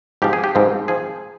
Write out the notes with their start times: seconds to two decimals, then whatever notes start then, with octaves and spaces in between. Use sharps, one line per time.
0.22 G#2 F3 C4 G4
0.33 G#4
0.44 G4
0.55 G#2 F3 C4
0.88 F3 C4 G#4